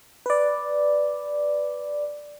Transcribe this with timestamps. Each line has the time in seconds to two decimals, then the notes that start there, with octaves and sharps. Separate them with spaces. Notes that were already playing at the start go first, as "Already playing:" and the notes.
0.26 B4 D5